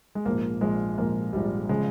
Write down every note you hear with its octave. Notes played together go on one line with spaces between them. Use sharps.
G#3
A#1 G#2 F3 A#3
A#1 G#2 F3 G#3
A#1 G#2 F3 A#3
A#1 G#2 F3 G3
C#3 F3 G#3